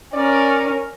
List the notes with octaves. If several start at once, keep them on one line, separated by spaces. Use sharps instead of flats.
C#4 A#4 D5